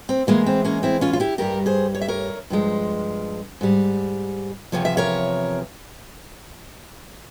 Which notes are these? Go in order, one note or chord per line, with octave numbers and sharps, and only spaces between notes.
C4
E2 E3 G#3 A#3
C4
A#3 C#4
C4 E4
C#4 F4
F4
E4 G4
G2 G3 G4 A#4
G#4 C5
C#5
E5
A#4 C#5
G2 F3 G#3
G#2 G3
E2 C3 F3 C#5
E5
A#4 C#5